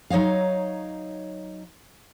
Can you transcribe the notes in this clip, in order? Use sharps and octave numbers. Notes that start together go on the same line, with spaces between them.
F#3 D#4 C#5 D#5 F5